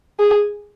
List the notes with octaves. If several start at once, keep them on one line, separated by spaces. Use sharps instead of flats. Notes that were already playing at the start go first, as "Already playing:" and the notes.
G#4